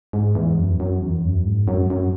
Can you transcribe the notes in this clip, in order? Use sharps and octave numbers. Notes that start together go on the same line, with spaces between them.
G#2
E2
F#2
F#2
E2
F#2
G#2
F#2
F#2